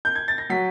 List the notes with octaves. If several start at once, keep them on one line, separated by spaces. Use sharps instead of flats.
G6
G#6
A6
A#6
F#3 B6